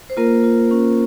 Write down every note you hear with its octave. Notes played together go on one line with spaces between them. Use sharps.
C5
A#3 F4 A#4
F4
C#4